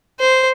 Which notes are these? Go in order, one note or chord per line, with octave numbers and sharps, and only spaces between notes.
C5